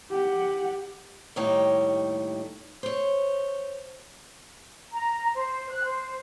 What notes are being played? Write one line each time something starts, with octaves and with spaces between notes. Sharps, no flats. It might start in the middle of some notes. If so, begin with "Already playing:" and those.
G4 F#5
D#2 A2 G3 A3 D#4 C#5
C5 C#5
A#5
C5
F#6
C5